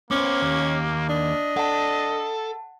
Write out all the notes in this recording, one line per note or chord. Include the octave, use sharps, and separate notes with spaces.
A#3 B3 C#4 C5 D6 F6
D#2
D4 D#5
A4 F#5 A5